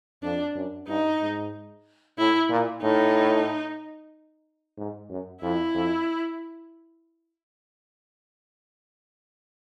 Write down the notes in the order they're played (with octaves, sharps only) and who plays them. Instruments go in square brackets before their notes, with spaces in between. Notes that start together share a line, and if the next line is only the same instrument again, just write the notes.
[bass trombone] F2 [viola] D4
[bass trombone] F#2
[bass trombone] G2 [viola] D#4
[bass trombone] G#2
[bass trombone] A2 [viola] E4
[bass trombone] A#2
[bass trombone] A2 [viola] D#4
[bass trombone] G#2
F#2
[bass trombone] F2 [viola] E4
[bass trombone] F2